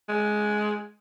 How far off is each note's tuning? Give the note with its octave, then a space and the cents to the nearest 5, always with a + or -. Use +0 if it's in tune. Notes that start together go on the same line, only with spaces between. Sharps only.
G#3 +15